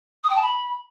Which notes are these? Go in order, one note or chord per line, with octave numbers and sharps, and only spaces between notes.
D#6
G5
A5
B5